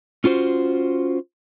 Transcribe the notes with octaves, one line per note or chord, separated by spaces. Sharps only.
C#4 F4 F#4 C5